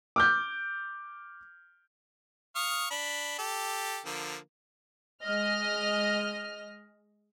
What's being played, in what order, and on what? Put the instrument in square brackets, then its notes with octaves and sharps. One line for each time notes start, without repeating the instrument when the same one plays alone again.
[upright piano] D6 F6 G6
[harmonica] F5 C#6 D#6
D4 B5
G4 A4
D3 F3 A#3
[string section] G#3 D#5 F6